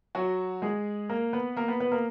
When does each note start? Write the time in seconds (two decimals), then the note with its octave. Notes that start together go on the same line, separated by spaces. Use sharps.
0.15 F#3 F#4
0.62 G#3 G#4
1.09 A#3 A#4
1.33 B3 B4
1.56 A#3 A#4
1.68 B3 B4
1.80 B3 B4
1.92 A#3 A#4